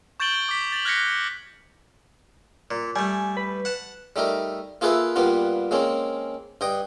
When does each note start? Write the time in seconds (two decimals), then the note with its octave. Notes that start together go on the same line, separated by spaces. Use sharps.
0.20 C#6 G6 A6 D7 F#7 G7
0.49 D6 B6
0.72 A6 F#7
0.85 F6 F#6 G#6 A#6 B6 C#7
2.71 A#2
2.96 G3 A3 G#5
3.37 B4
3.65 F#5 A5
4.16 G3 A3 D#4 A#4
4.81 A#3 F4 G#4 A4 B4 E5
5.16 G2 G3 A#3 B3 F4
5.71 G#3 A#3 C4 C#4
6.61 G2 D#5 G5 D#6